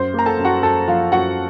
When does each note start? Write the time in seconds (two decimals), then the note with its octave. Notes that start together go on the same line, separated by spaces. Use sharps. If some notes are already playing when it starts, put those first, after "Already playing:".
Already playing: F#2 C5 C6
0.14 A#3 A#5
0.26 A4 A5
0.39 F#2
0.45 F#4 F#5
0.63 F#2 A4 A5
0.88 F3 F4 F5
1.12 F#2 F#4 F#5